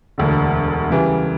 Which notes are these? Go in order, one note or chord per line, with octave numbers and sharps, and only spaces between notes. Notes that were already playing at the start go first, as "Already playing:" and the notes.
E1 D2 D3
C#3 E3 G3